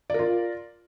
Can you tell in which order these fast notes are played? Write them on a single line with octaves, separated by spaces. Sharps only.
D5 A#4 F4